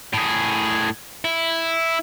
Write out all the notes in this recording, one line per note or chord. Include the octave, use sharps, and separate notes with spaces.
A2 G#4
E4